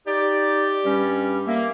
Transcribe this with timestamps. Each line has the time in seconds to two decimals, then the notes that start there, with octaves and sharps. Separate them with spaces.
0.06 D#4 G4 D5
0.85 G2 G3 C#4
1.47 A#3 E5